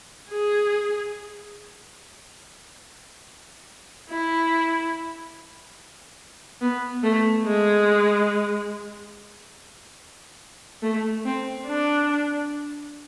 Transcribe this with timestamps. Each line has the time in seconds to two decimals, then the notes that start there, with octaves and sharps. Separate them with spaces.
0.30 G#4
4.10 E4
6.61 B3
7.03 A3
7.46 G#3
10.83 A3
11.25 C4
11.67 D4